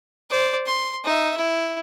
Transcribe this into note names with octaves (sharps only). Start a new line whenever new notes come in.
C5 D5
C6
D#4 E5
E4